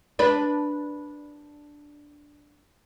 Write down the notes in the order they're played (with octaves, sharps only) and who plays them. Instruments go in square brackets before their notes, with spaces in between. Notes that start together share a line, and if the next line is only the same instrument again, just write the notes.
[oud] D4 B4